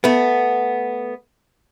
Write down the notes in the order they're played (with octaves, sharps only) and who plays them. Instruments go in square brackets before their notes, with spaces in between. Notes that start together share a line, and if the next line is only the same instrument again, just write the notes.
[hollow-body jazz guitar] A3 B3